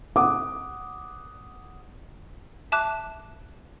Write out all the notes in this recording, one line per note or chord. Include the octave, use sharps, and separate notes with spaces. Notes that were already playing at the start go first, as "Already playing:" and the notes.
F#5 D6 D#6
E5 A5 D6 F#6